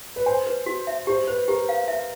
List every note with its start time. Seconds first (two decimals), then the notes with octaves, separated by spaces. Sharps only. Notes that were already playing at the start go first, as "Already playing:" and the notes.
0.16 B4
0.26 C5 G#5
0.46 B4
0.66 F#4
0.87 E5
1.07 G4 C5
1.27 B4 C5
1.48 G4 A#4
1.69 F5
1.88 E5